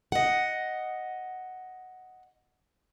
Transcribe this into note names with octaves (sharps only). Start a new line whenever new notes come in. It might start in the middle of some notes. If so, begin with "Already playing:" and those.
D#5 F#5